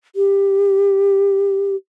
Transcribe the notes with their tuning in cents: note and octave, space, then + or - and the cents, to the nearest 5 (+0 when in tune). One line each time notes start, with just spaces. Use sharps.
G4 +15